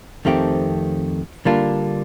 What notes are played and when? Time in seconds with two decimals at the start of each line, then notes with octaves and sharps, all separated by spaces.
0.25 F2 D#3 A3 C4 G4
1.45 D3 G3 A#3 D4 F4